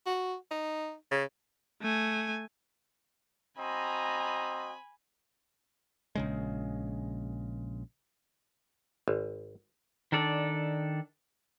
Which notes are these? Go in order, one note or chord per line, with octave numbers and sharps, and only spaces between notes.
F#4
D#4
C#3
A3 G#5
C4 F#4 D#5 G#5 A#5 B5
A#1 C#3 G#3
G#1
D#3 D4 A4 D5